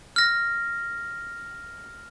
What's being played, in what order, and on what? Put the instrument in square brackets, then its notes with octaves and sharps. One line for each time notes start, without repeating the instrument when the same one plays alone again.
[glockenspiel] F6 A#6